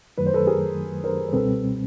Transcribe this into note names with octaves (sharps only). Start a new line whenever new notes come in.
F#2 D#3 F#3 A3 B4
C5
A4 B4
G#4 A#4
A#4 C5
C5
C#2 B2 G3 C4 A4 B4